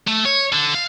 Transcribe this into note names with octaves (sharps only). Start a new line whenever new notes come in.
A3
C#5
D3
F5